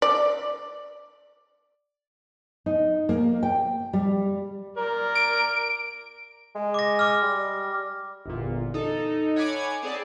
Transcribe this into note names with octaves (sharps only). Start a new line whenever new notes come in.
D5
D#4
A#3
G5
G3
A#4 D5
D7
G#3
D6 A#6
D6 F6
G3
G1 E2 A#2
D#4 A4
C#5 F#5 G#5 B5 D6 G#6
C4 G#4 D5 A5